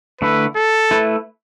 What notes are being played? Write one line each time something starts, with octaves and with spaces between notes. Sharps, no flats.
D3 A3 E4 B4
A4
A3 E4 B4